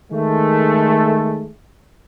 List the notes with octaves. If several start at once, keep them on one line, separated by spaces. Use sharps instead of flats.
D#3 G#3 A3